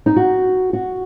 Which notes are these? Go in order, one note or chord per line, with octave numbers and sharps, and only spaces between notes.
D#4
F#4
F#4